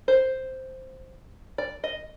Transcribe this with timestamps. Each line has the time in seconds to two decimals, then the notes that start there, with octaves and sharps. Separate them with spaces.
0.08 C5
1.58 D5
1.84 D#5